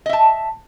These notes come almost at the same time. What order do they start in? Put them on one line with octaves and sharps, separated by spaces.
D#5 E5 A5